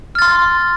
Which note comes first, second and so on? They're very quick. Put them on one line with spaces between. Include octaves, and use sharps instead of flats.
F6 A6 C6